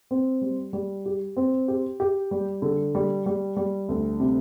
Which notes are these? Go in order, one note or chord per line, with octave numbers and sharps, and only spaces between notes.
C4
G3
G3
G4
C4
G4
G4
G3
D3
G3
G3
G3
D2
C3